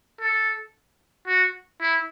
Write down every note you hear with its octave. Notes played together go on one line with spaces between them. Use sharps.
A4
F#4
E4